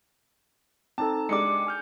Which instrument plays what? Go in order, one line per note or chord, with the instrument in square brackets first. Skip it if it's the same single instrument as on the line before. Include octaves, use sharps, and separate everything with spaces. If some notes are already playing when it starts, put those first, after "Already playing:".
[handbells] C4 D#4 A4 [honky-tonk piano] A5
[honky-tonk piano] G#3 D4 G4 [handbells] D6 C#7
[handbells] G#5 F6 G6